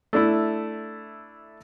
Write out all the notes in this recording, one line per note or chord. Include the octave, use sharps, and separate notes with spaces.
A3 D4 E4